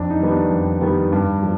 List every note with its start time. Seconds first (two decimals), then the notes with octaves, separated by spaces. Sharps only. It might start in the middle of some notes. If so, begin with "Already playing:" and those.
Already playing: F2 D4
0.10 D#4
0.20 D#3 G3 B3
0.31 D4
0.51 F2
0.81 D#3 G3 B3
1.12 G2
1.42 F3